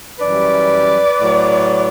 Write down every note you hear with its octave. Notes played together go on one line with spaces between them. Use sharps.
F#2 E3 G3 B4 D5
A2 F#3